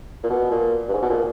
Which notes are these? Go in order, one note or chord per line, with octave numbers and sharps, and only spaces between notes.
A#2
B2
A#2
G2
G#2
B2
A#2